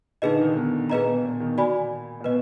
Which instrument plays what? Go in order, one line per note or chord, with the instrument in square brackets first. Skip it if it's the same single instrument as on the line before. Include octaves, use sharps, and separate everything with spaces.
[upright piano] A#2 D3 [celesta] D#4 G#4 B4 D#5
[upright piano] D#3
D3
B2
[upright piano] A#2 [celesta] G#4 B4 D#5 A#5
[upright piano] B2
A#2
B2 D#3
[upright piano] A#2 [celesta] F#4 D5 G#5 B5
[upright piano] A#2
[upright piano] B2 [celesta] B4 D#5